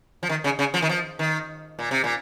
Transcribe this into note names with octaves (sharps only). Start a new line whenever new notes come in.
F3
D#3
C#3
C#3
F3
D#3
F3
D#3
A#2
C3
A#2